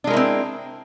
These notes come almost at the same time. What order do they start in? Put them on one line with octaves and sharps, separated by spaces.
D4 G#3 A#4 E4 C4